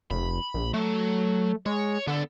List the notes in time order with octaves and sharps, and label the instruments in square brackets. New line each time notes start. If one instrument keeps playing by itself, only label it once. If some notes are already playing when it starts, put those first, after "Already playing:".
[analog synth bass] F1 [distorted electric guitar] B5
[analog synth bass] A#1
[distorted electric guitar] F#3 [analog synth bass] A3
[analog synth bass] G#3 [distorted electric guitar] C#5
[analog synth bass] D3 [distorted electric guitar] B3 A4